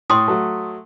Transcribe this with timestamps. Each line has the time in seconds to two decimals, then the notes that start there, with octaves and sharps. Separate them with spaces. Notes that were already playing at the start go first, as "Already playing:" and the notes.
0.10 A2 C6 D#6
0.28 F#3 A3